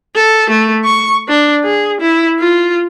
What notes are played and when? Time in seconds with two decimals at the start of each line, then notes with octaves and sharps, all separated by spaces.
0.15 A4
0.50 A3
0.85 C#6
1.28 D4
1.64 G#4
2.01 E4
2.40 F4